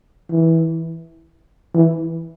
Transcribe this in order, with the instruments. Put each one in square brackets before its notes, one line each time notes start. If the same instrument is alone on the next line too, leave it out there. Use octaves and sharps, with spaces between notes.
[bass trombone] E3
E3